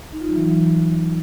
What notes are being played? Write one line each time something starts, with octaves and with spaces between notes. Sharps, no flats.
D#4
F4
F#3
E3
F#3